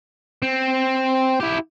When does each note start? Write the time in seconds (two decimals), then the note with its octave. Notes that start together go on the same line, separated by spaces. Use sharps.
0.42 C4
1.41 E4 G4